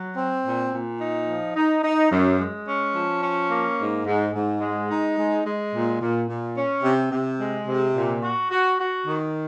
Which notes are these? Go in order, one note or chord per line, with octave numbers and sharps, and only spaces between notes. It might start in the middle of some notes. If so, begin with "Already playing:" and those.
Already playing: F#3
C4
A#2
A#2
D#4
F3
D#4
D#4
F#2
G#3
C#4
F3
C#4
A#3
G#2
G#2
G#2
G#3
D#4
G#3
G#3
A#2
A#2
A#2
C#4
C3
C3
G#3
C3
A#2
F#4
F#4
F#4
D#3